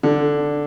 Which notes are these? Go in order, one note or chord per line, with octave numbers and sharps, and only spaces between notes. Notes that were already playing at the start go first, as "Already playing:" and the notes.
D3